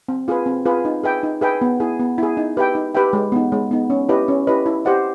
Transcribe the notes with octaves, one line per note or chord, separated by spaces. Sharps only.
C4
F4 G#4 B4
C4
F4 G#4 B4
D#4
G#4 B4 E5 G5
D#4
G#4 B4 E5 G5
B3
E4 G#4
B3
E4 G#4
D#4
G4 B4 E5 G5
D#4
G4 B4 E5 G5
G#3
B3 D#4
G#3
B3 D#4
C#4
E4 G4 B4 D#5
C#4
E4 G4 B4 D#5
E4
G4 C5 D#5 F#5